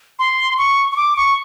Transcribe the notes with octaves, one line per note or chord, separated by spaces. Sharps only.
C6
C#6
C#6
D6
C#6